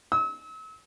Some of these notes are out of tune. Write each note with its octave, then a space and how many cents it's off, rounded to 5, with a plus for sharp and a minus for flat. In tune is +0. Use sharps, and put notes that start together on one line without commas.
E6 -40